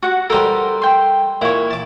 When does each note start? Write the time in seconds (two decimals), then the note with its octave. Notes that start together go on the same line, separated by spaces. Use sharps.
0.03 F#4 F#5
0.30 G3 G4 A4 A#4 C5
0.82 G5 C6
1.41 A#2 E4 C#5
1.71 A5 D6